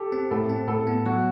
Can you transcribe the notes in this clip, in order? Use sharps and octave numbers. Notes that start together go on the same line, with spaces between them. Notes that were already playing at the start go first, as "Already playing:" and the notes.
Already playing: G4 A4
C4
A2 A4
C4
A2 A4
B3
F#3 F#4